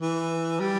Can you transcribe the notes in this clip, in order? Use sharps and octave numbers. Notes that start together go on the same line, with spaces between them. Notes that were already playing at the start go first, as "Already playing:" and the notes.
E3
G3